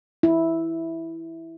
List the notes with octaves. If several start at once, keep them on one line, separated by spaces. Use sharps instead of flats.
E4